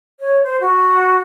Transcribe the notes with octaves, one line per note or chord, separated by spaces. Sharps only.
C#5
C5
F#4